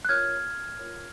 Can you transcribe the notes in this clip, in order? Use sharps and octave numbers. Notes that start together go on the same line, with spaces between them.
F#6
F4 A#4 C#5 F6 G#6
F4 A#4 C#5